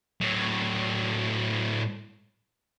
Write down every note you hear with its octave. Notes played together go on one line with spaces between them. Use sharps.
A2 F#3